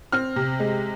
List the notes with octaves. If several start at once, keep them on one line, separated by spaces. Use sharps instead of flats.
C4 F6
C3
G#3